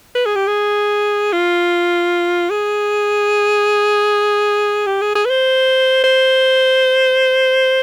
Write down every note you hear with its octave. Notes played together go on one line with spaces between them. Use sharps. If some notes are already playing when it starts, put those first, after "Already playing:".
B4
G#4
G4
G#4
F4
G#4
G4
G#4
G#4
B4
C5
C5